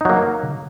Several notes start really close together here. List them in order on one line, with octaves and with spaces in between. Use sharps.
D#4 F#3 A#3